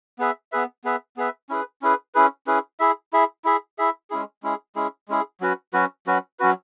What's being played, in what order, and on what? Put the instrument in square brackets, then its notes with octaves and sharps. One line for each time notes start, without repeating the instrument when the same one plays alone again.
[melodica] B3 G#4 B4 E5
B3 G#4 B4 E5
B3 G#4 B4 E5
B3 G#4 B4 E5
C#4 E4 G#4 B4
C#4 E4 G#4 B4
C#4 E4 G#4 B4
C#4 E4 G#4 B4
E4 G#4 E5
E4 G#4 E5
E4 G#4 E5
E4 G#4 E5
G#3 C#4 E4 G#4
G#3 C#4 E4 G#4
G#3 C#4 E4 G#4
G#3 C#4 E4 G#4
F#3 C#4 F#4 B4
F#3 C#4 F#4 B4
F#3 C#4 F#4 B4
F#3 C#4 F#4 B4